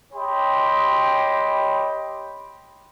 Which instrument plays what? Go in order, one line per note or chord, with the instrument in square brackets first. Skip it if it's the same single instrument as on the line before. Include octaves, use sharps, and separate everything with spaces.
[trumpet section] G4 C#5 D#5 G5 B5 C6